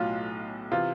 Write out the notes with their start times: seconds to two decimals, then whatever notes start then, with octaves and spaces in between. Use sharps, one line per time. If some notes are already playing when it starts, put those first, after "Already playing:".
Already playing: B1 A2 F#3 F4
0.72 C3 E3 F4